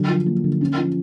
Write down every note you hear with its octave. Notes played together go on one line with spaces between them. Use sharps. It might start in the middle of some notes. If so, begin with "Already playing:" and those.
Already playing: D3 F#3
F3
A#3
D3
C#4
F3